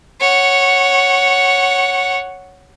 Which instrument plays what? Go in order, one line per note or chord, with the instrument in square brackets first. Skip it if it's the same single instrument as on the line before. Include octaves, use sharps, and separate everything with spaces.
[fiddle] C#5 F#5